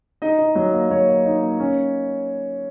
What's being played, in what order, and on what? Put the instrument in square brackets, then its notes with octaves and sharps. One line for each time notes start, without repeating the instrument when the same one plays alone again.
[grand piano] D#4 D#5
D#4
F#3
A#3
F#3 C#5
A#3
D#4
A#3
C#4